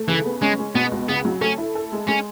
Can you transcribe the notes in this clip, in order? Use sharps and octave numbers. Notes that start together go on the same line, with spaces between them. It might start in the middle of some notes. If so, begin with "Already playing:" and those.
Already playing: A3
C#3 E3
B3
G#3 C#4
G#3
B2 B3
C#2
C#3 B3
F#3
A3 C#4
E4
A4
G#3
G#3 C#4